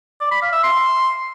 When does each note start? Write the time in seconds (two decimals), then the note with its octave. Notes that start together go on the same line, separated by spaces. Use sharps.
0.21 D5
0.31 B5
0.42 F5
0.53 E5
0.63 C6